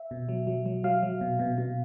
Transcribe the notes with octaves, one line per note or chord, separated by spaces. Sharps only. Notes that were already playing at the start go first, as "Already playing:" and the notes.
Already playing: E5
B2
F#3
F#3
F#3
F#3 F5
F#3
B2
B2
B2